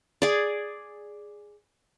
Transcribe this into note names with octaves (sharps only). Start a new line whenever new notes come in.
G#4 D5